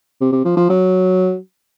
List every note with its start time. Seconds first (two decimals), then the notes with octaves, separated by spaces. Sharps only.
0.21 C3
0.32 C3
0.45 F3
0.57 F3
0.69 F#3